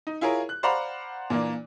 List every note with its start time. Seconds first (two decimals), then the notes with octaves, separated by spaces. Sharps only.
0.07 D#4
0.21 E4 F4 G#4 A#4 C#5
0.49 F#6
0.63 C5 D5 F5 F#5 A#5 B5
1.30 A#2 E3 A#3 D4